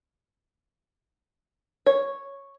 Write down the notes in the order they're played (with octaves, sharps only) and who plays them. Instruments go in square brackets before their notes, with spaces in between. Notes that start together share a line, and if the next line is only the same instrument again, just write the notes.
[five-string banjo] C#5